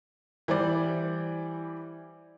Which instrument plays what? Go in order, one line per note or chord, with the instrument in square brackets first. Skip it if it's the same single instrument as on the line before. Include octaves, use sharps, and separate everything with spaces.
[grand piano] E3 G3 C5 D5